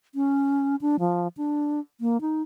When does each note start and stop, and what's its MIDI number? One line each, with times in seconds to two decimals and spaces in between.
0.15 0.76 61
0.81 0.96 62
1.00 1.28 53
1.37 1.80 62
2.01 2.20 58
2.21 2.42 63